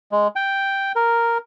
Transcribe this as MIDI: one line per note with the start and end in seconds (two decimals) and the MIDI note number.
0.12 0.28 56
0.36 0.92 79
0.95 1.38 70